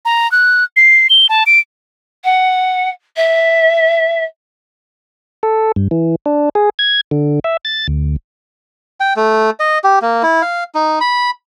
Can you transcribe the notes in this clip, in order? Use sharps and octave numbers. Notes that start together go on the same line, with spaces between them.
A#5
F#6
C7
G7
A5
D7
F#5
E5
A4
G2
E3
D4
G#4
G#6
D3
E5
A6
D2
G5
A3
D#5
G4
A#3
E4
F5
D#4
B5